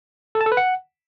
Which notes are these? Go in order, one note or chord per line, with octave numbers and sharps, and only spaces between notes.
A4
A5
A4
B4
F#5